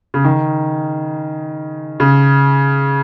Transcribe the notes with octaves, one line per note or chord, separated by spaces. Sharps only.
C#3
D#3
C#3